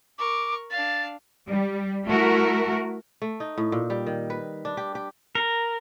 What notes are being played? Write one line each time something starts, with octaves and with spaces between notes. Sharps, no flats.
A#4 C#6 D6
D4 F5 A6
G3
A3 E4 F#4 A#4
A3
D#4
A2
A#2
G3
D#3
B4
D4
G4
G4
A#4